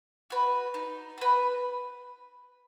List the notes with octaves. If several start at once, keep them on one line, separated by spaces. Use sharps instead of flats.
F#4 B4
D#4
F#4 B4